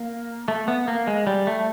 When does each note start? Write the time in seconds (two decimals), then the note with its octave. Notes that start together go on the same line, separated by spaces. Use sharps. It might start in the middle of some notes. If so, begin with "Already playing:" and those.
Already playing: A#3
0.48 A3
0.68 B3
0.88 A#3
1.07 G#3
1.27 G3
1.47 A3